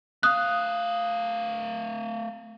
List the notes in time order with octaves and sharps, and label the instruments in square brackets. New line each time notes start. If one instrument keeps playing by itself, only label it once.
[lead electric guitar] A3 F5 [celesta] D#6 F#6